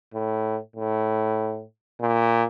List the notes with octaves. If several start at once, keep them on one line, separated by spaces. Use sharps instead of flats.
A2
A2
A#2